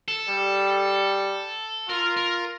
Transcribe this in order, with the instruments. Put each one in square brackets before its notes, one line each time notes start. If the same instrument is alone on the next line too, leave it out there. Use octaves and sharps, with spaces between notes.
[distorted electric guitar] A4
[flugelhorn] G3
[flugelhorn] F4 [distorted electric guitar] A#4
[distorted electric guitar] A#4